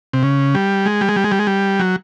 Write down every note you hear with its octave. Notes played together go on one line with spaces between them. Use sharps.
C3
C#3
G3
G#3
G3
G#3
G3
G#3
G3
G#3
G3
F#3